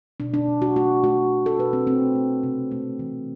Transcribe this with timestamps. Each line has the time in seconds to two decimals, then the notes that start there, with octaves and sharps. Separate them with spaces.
0.20 B2 D4
0.34 D4
0.47 B2
0.62 F#4
0.76 A3 F#4
1.04 A3 F#4
1.32 B2
1.46 A4
1.59 B2 B4
1.73 C4
1.87 A3 C4
2.15 A3
2.44 C3
2.71 A3
2.99 E3